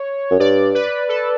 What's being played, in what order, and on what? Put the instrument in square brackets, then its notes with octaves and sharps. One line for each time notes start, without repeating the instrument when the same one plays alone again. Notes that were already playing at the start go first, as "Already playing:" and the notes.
Already playing: [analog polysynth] C#5
[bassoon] F#2
[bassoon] G2 [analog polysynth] D5
[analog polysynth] B4
A4